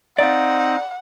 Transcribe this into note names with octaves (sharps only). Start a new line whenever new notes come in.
C4 D#4 D5 F5 F#5